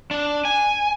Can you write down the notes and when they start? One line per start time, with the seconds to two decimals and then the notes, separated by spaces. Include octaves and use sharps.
0.11 D4
0.45 G#5